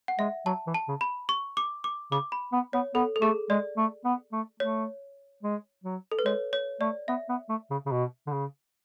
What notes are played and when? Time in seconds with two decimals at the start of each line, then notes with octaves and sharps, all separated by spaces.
0.08 F#5
0.19 G#3 E5
0.46 F#3 A5
0.67 E3
0.74 A5
0.88 C#3
1.01 B5
1.29 C#6
1.57 D6
1.84 D6
2.11 C#3 D6
2.32 B5
2.53 B3
2.73 B3 C#5
2.94 B3 A4
3.16 A4
3.22 A3 G#4
3.50 G#3 D5
3.77 A3
4.05 B3
4.32 A3
4.60 A3 C#5
5.43 G#3
5.84 F#3
6.12 A4
6.19 B4
6.25 G#3 C#5
6.53 C#5
6.80 A3 D5
7.08 B3 E5
7.29 B3
7.49 A3
7.70 C#3
7.86 C#3
7.91 B2
8.27 D3
8.32 C#3